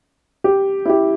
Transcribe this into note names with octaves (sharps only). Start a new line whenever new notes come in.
G4
E4
G4